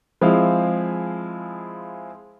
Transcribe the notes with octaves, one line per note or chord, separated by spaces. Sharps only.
F3 G#3 C4 E4 G#4 F5